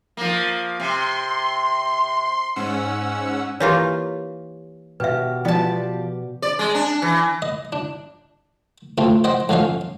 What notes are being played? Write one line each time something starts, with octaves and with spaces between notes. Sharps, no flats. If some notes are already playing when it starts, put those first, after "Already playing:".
F3 A#3
C3 C6
G#2 C#4 F#5 E6
E3 A#3 F4 G4 C#5
B2 G4 B4 E5
F3 B3 G4 D5 A5
D5
G#3
D4
E3
D#5
D4
A3 C4 F4
C5 D#5 F#5 G5
F2 D3 F3 C#4 F5